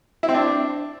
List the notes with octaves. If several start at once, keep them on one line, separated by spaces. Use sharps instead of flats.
E4
C4
D4